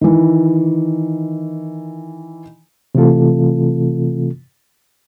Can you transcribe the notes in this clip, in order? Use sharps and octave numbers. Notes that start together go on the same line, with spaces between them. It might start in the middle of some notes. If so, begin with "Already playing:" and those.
D#3 E3
C3 E3 A3 C4 F4 A4